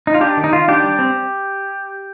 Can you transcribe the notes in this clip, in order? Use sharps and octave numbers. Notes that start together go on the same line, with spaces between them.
D#4
F4
D4 G4
D#3
D#4
D#3 F4
D4 G4
G3
C4